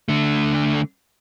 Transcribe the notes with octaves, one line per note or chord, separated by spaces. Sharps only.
D3 A3